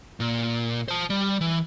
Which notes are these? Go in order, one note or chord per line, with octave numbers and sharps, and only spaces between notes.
A#2
C5 A5
G3
E3